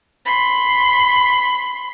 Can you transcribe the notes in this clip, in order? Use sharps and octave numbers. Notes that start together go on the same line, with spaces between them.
B5 C6